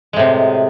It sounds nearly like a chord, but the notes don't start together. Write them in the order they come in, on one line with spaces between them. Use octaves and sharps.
G#3 A2 C3